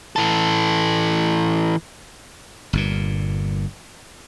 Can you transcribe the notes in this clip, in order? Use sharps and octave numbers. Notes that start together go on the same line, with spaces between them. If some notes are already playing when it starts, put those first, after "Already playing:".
E3 A4
G1 G2 A#2